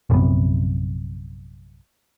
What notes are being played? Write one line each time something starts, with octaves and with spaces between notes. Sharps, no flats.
A#1 F#2 C3 B3